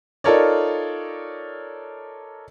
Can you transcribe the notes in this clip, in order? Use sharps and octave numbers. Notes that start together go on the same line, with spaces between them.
D#4 F4 A4 A#4 C#5 D5